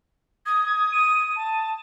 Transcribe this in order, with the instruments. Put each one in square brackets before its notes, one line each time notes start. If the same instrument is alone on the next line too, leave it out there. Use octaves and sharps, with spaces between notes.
[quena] D#6 [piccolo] G#6
[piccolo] D#7
A5